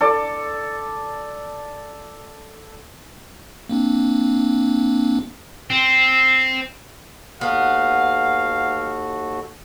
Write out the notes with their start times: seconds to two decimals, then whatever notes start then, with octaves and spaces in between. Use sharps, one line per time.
0.01 A4 D5
3.69 A#3 C4 D4
5.70 C4
7.41 D#2 B3 F#4 A4 F5